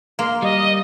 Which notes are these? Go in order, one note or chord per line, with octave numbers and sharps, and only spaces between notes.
A#3 C6
G3 D#5